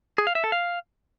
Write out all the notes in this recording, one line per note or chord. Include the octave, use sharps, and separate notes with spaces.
G#4
F5
E5
A4
F5